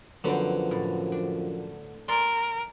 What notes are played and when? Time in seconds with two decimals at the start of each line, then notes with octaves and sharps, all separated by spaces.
0.24 F#2 D3 F3 F#3 B3 C4
0.71 A2
1.12 D4
2.08 A#4 D5 G#5 C6